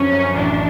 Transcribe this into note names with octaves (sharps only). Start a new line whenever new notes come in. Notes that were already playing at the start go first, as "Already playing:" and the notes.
Already playing: F#2 D3 F3 C#4
F#2
A1 D4